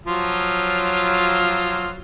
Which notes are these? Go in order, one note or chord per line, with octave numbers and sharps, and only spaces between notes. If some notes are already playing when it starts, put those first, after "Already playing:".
F3 F#3 F4